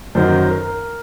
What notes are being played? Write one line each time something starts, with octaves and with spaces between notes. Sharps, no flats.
F#2 D#3 F#3 C5
A#4